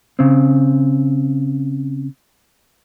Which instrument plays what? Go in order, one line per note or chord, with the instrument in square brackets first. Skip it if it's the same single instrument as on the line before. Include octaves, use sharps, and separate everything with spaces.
[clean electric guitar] C#3 C4